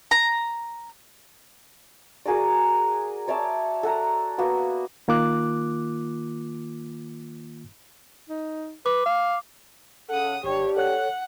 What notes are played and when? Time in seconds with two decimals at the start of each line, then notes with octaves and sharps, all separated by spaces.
0.11 A#5
2.26 F#4 G#4 A#4 D5
3.28 C#5 D5 E5 A5
3.83 A4 F#5 A#5
4.38 A#3 B3 F#4
5.08 D#3 A#3 F4 D6 F#6
8.29 D#4
8.86 B4 D6
9.06 F5
10.10 C#3 A4 F#5 D#6
10.44 G#1 G2 D4 G4 C#5
10.77 A4 C#5 F#5 F#6